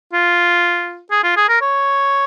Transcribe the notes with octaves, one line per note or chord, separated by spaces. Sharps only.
F4
G#4
F4
G#4
A#4
C#5